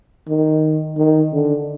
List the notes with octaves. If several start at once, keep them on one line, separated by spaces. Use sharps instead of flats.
D#3
D#3
D3